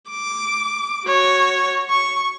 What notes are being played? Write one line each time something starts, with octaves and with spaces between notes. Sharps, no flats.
D6
F#4 C#5
C#6